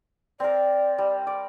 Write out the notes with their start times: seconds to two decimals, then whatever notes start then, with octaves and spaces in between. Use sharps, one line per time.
0.40 C4 A#4 D5
0.98 G3
1.27 D5